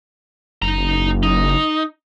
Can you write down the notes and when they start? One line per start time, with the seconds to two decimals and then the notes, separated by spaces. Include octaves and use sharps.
0.62 F#1 D#4 A#5
1.23 D#4